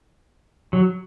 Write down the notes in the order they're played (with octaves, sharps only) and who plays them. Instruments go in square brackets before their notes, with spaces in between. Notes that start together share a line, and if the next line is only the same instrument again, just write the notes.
[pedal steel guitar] F#3